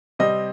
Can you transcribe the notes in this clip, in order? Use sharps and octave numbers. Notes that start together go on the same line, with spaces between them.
C3 G3 C4 D#5